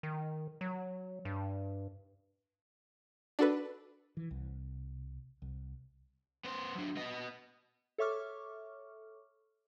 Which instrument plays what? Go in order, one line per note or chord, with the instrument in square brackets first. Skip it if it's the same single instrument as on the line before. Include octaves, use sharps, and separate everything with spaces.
[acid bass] D#3
F#3
G2
[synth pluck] D4 F#4 A4 B4
[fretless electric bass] E3
C2
C2
[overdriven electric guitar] B3 C5
F#3 D4
B3 D#5
[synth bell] A4 C#5 E5 C#6 D6 F6